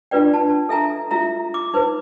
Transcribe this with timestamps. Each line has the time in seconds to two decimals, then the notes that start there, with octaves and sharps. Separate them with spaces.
0.11 D4 F4 B4 D5 G5
0.33 A5
0.69 A4 E5 G#5 A#5
1.11 E4 F4 E5 A#5
1.54 D6
1.74 D#4 B4 C5